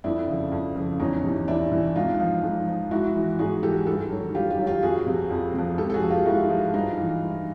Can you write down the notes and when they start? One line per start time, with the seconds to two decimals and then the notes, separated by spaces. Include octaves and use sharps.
0.04 F2 D4 E4
0.28 C#3 F3
0.52 F2
0.76 C#3 F3
1.00 E2 C#4 D#4
1.24 C3 E3
1.48 E2 D4 E4
1.72 C3 E3
1.96 G#2 D#4 F4
2.20 F3
2.43 G#2
2.67 F3
2.91 G#2 E4 F#4
3.15 E3
3.39 G#2 F#4 G#4
3.63 E3 G4 A4
3.86 G2 G4 A4
4.11 D#3 F#3
4.35 G2 F4 G4
4.50 F4 G4
4.59 D#3 F#3
4.66 F4 G4
4.83 F2 F#4 G#4
5.07 C3 F3
5.31 F2
5.54 C3 F3
5.78 G#2 G4 A4
5.90 A4
5.94 F#4 G#4
6.02 F3
6.11 F4 G4
6.26 G#2 E4 F#4
6.50 F3
6.74 G2 D#4 F4
6.98 E3
7.22 G2